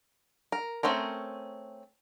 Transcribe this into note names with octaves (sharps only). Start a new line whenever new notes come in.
A#4
A3 C4 C#4 A#4